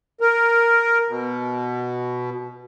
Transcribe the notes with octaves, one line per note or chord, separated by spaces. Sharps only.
A#4
B2